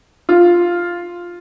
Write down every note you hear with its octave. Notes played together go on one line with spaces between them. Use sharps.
F4